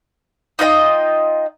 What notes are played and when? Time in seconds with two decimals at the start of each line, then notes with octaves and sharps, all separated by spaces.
0.59 D#4 F4 D#5 G5